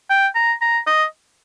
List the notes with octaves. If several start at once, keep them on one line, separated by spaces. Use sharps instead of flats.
G5
A#5
A#5
D#5